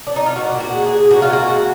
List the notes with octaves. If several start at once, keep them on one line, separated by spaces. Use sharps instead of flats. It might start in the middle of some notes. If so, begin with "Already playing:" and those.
D4
D#4
F4
A#2 F#4
A#2
F#4
G#3
G#4
G#3
A#2 F#4
F4
A#2 F#4
G#3